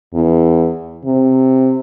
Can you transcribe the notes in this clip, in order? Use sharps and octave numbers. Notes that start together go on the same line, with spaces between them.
E2
C3